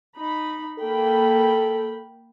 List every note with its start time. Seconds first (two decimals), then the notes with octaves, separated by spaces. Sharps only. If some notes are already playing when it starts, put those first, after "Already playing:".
0.16 D#4 B5
0.79 A#3 A4 G5 B5